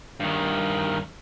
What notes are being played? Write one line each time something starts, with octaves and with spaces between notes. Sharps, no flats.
G2 D#3